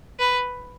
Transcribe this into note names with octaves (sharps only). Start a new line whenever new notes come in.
B4